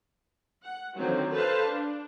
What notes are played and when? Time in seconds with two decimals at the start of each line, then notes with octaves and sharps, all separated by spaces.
0.62 F#5
0.96 D3 D#3 F3 F#3 C4
1.33 A4 B4 C5 F5 A5
1.67 D4